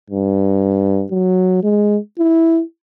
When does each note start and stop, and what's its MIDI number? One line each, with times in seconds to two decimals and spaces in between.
0.11 1.05 43
1.11 1.59 54
1.63 1.98 56
2.19 2.61 64